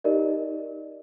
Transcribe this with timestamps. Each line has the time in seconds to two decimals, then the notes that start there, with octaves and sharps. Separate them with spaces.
0.04 D#4 G4 A#4 D5 D#5